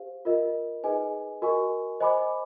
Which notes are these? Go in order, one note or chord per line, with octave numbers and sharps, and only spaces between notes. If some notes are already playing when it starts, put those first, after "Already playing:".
Already playing: G4 C5 F5
F4 A#4 D#5
D#4 G#4 B4 D#5 G#5
F#4 A#4 D#5 G#5 C#6
C5 D#5 G#5 B5 D6